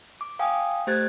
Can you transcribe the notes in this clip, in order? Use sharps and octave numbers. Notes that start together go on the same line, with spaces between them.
D6
F5 G5 G#5 D#6
A3 G4 C5 F#6 G#6 A6